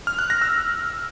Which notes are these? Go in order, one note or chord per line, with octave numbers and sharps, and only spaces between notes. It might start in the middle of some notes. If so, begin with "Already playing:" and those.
F6
F#6
A#6
E6